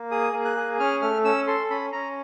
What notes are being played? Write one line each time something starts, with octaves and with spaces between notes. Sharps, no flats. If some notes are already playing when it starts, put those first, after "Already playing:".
Already playing: A#3
G#4 D#6
A#3
F#6
G#4
C#4 F6
A3 F6
C#4 E6
A4 C6
C#4 B5
C#4 A#5